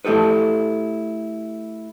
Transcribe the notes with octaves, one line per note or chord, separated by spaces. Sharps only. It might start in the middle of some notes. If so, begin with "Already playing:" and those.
A3 E4 G4 A4 B4